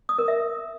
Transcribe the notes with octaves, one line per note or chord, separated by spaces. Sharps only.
D#6
A#4
E5